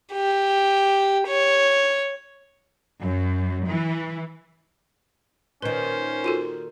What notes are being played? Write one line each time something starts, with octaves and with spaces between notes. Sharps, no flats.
G4
C#5
F#2
E3
A#2 D#3 C#4 B4 C5
F4 F#4 A4